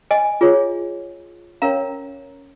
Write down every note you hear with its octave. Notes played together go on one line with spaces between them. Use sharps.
D#5 G#5
F4 G#4 C#5
C#4 A#4 C#5 F5 A#5